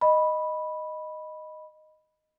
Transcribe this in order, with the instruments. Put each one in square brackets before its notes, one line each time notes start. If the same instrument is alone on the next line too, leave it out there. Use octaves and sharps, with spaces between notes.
[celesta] D#5 B5